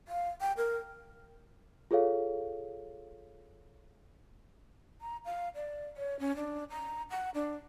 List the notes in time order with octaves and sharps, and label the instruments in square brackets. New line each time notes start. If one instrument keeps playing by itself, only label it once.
[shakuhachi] F5
G5
A#4
[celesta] F4 G#4 A4 C#5 F5
[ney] A#5
F5
D5
C#5
C#4
D4
A#5
F#5
D4